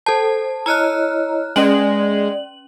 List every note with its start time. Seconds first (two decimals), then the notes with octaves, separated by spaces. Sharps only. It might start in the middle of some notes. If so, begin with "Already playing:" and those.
0.06 A4 C5 A5
0.66 E4 C#5 D#5 A#5 F6 F#6
1.56 G#3 C#4 D5 F#7